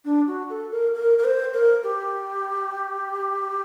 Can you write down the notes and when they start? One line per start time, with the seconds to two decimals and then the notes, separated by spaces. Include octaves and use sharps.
0.05 D4
0.27 F#4
0.50 A4
0.72 A#4
0.94 A#4
1.18 A#4
1.24 C5
1.54 A#4
1.83 G4